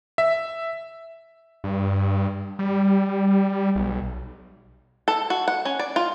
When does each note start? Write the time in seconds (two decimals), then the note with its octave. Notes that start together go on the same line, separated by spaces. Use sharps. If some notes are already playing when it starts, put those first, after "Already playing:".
0.18 E5
1.64 G2
2.59 G3
3.76 B1
5.08 A4
5.30 F#4
5.48 F#5
5.65 C#4
5.79 D5
5.96 F4